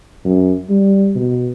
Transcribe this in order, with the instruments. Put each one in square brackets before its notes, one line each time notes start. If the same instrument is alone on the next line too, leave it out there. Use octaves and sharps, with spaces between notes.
[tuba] F#2
G3
B2